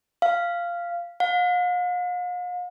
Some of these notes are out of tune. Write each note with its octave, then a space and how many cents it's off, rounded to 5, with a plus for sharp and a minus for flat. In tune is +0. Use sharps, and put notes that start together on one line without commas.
F5 -10
F5 +45